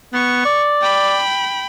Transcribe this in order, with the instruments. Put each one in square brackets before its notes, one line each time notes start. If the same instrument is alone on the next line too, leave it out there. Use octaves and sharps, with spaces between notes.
[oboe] B3 [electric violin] C#6
[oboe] D5
[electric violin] G5 B5